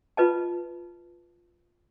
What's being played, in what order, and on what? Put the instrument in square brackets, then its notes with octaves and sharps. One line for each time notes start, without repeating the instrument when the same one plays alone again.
[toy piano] F4 B4 D#5 A5